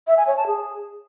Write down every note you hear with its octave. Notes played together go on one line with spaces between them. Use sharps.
E5
G#5
C#5
A5
G#4